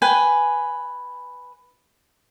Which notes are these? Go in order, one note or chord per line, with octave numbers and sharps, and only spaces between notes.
B4 G5 G#5